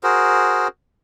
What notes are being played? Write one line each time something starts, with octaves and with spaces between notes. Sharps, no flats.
F#4 G#4 A#4 C5